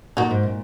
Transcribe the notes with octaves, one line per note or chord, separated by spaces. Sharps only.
A#2 D#4 F#4
G#2
A#2